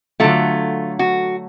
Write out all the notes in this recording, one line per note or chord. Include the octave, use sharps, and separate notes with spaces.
D3 F#3 A3 F4
F#4